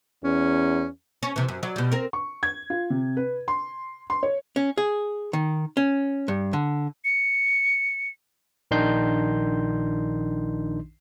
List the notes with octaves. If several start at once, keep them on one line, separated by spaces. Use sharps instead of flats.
E2 C#4
C#4
C3 E3
F#2
F#3 D5
B2 G3
C4 A#4
C#6
G#6
F4
C3
B4
C6
C6
C#5
C#4
G#4
D#3
C#4
G2
D3
C#7
A#1 D#3 D4 D#4 C6 G6